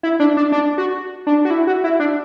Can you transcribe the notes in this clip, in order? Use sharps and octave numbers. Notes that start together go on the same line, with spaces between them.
E4
D4
D4
D4
F#4
D4
F#4
E4
F#4
E4
D4